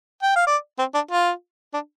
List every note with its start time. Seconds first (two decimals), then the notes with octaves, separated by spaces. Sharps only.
0.23 G5
0.36 F5
0.47 D5
0.79 C4
0.94 D4
1.11 F4
1.74 D4